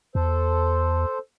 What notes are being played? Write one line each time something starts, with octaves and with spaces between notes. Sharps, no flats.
E2 A4 C5